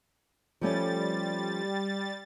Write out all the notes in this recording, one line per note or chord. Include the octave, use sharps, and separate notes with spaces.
F3 G3 A3 C#4 A6